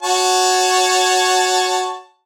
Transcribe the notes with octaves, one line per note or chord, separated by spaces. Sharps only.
F#4 C#5 A5